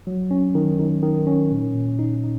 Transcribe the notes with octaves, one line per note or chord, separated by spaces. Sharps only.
F#3
C#4
D#3
D#3
D#3
C#4
A#2
A#2
D#4
D#4